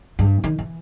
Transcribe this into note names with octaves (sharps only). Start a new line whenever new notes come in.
G2
D#3
E3